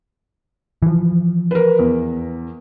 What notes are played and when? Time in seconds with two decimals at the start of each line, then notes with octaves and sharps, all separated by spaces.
0.82 E3 F3
1.51 A#4 B4
1.79 E2